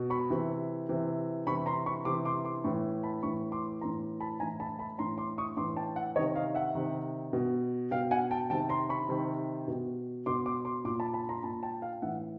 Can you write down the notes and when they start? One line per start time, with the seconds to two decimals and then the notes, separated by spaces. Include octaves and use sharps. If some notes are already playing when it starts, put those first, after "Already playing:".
Already playing: B2
0.10 B5 C#6
0.30 C3 E3
0.89 C3 E3
1.47 C3 E3 B5 C#6
1.66 A#5 C6
1.86 B5 C#6
2.05 C3 E3 C6 D6
2.25 C6 D6
2.45 C6 D6
2.64 A2 E3 B5 C#6
3.03 A5 B5
3.23 A2 E3 B5 C#6
3.52 C6 D6
3.81 A2 E3 A#5 C6
4.20 A5 B5
4.40 A2 E3 G#5 A#5
4.60 A5 B5
4.79 A5 B5
4.99 A2 E3 A#5 C6
5.18 C6 D6
5.38 C#6 D#6
5.57 A2 E3 C6 D6
5.77 G5 A5
5.96 E5 F#5
6.16 C3 D#3 C#5 D#5
6.35 D#5 F5
6.55 E5 F#5
6.75 C3 D#3
7.33 B2
7.91 B2 F5 G5
8.11 F#5 G#5
8.31 G5 A5
8.50 C3 D#3 G5 A5
8.69 A#5 C6
8.89 B5 C#6
9.09 C3 D#3
9.68 B2
10.26 B2 C6 D6
10.46 C6 D6
10.65 C6 D6
10.85 A#2 C6 D6
11.00 A5 B5
11.14 A5 B5
11.29 A#5 C6
11.43 A#2 A5 B5
11.63 G5 A5
11.82 F5 G5
12.02 A2 E3 E5 F#5